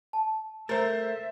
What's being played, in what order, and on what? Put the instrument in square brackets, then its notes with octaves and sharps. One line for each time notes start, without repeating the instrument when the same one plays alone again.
[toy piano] A5
[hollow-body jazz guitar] A3 A#4 [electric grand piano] C5 A6 [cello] E5